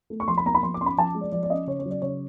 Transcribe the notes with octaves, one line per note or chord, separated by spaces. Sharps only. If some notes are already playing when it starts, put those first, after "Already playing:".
A3
C#6
F3 C6
B5
A#3 A#5
B5
F3 C6
D6
C#4 C6
B5
F3 A5
G#3
D5
F3 D5
D5
C#4 D#5
C#3 C#5
C#5
F#3
D5
C#3 C#5